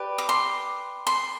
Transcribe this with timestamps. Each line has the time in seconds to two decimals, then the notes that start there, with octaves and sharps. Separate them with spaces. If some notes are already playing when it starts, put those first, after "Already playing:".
Already playing: G4 B4 D5
0.18 D6
0.29 C6
1.07 C6